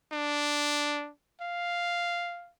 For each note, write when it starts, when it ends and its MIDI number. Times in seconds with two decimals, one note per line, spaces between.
0.12 1.10 62
1.41 2.51 77